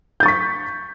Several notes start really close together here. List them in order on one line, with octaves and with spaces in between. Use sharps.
G6 A6 C#6 B6